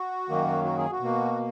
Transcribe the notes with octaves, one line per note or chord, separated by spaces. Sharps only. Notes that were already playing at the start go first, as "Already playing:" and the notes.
Already playing: F#4
F#2 D#3 F#3 A#3
F#4
G#4
F#4
B2
A#3